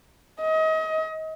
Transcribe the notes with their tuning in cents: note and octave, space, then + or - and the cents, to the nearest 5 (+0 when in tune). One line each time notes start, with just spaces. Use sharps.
D#5 +30